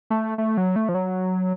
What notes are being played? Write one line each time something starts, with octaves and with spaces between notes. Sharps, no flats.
A3
A3
F#3
A3
F3
F#3